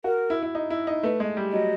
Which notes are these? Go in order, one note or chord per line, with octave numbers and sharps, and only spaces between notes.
F#4 A#4
E4
E4
D#4
E4
D#4
A3 B4
G#3
G3
F#3 D#5